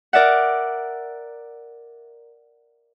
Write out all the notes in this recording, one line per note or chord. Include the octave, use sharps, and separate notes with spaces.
A#4 D5 E5 F#5